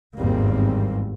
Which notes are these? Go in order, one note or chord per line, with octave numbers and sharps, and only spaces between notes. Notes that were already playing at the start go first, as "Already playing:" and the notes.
G#1 E2 G2 G3 A#3 C4